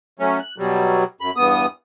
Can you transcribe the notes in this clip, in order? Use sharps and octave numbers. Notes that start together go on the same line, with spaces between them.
F#3 A3 C#4
F#6
B2 F#3 G3
F#2 B5
E2 G2 B3 D#6